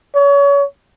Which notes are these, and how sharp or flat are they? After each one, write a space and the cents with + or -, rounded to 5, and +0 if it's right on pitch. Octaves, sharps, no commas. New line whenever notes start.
C#5 +30